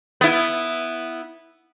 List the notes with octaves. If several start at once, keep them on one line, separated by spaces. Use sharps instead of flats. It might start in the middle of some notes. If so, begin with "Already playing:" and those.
B3 E4